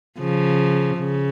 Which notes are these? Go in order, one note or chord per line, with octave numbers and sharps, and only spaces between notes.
C#3 F3
C#3